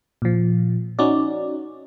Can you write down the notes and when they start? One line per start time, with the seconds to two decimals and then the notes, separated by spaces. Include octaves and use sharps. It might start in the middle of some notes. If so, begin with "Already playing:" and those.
0.22 A#2 F3
0.99 C#4 D#4 F#4 D5